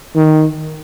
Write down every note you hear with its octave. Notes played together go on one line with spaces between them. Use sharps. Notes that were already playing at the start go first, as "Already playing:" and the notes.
D#3